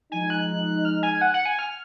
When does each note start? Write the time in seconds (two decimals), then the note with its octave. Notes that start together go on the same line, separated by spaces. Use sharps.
0.12 F3 G#3 D#4 G#5
0.30 F#6
0.85 F6
1.03 G#5
1.21 F#5
1.34 F#5
1.45 G#5
1.59 F6